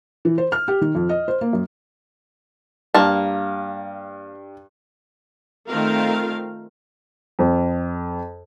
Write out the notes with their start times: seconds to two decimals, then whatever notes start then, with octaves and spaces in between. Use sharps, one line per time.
0.25 E3
0.38 C5
0.52 F6
0.68 G4
0.81 D#3
0.95 F2
1.09 D#5
1.28 C5
1.41 A#3
1.53 F#2
2.94 G2 A#3 A5
5.67 D#3 A3 C4 F4 A#4 F5
7.39 F2